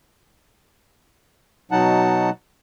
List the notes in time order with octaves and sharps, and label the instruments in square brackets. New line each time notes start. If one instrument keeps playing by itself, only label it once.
[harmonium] B2 F#3 D#4 F#5 A5